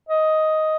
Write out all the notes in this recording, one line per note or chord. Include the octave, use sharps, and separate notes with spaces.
D#5